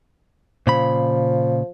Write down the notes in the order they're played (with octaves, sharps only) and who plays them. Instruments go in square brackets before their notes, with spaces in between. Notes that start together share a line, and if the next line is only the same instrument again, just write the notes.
[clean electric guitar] A#2 C#3 B5 [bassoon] F3